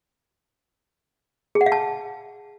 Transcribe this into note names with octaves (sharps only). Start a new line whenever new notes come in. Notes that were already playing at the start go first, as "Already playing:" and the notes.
G#4
F#5
F5
A5